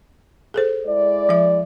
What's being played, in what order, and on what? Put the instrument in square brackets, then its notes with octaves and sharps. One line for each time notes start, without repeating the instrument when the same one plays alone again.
[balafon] G#4 A4 C5
[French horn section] G#3 E4 D5
[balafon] F3 E5